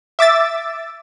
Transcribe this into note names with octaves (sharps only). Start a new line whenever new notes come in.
E5 D6 E6 A6